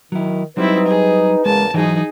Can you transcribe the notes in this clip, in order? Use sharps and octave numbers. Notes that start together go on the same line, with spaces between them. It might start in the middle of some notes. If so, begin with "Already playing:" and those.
D#3 F#3 E4
F#3 G3 C4 D#4 E4 B4
G#4
E2 C#3 G#3 A#3 A5
G#2 E3 F#3 D#4 G#4